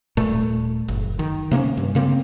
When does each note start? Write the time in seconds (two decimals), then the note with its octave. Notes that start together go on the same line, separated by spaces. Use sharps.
0.17 D#1 A#2 A3
0.88 F#1
1.19 D#3
1.51 C3 A#3 B3 C#4
1.77 G2
1.95 C#3 A#3 C4